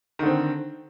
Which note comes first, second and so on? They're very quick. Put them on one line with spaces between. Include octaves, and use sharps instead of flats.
D#3 D3 C4